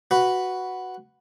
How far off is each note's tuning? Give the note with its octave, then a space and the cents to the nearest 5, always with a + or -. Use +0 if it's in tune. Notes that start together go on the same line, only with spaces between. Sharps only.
F#4 +0 B4 +0